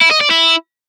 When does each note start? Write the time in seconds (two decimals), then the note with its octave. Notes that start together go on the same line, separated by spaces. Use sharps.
0.02 E4
0.11 D#5
0.21 D5
0.31 E4